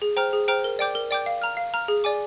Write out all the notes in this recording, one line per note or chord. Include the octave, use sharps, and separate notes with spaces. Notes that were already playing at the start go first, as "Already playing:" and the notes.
G#4
C5 G5 A#5 F6
G#4
C5 G5 A#5 F6
A#4
D5 G5 D6 G6
A#4
D5 G5 D6 G6
F5
A#5 F6
F5
A#5 F6
G#4
D5 G#5 D6